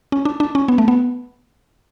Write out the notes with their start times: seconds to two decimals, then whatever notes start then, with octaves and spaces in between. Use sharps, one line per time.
0.12 C#4
0.25 D4
0.40 D4
0.55 C#4
0.68 B3
0.78 A3
0.88 B3